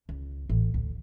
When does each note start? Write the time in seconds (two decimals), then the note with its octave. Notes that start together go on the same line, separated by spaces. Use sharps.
0.09 C#2
0.49 A1
0.74 D2